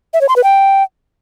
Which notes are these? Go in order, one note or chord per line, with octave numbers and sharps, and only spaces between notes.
E5
C#5
C6
B4
G5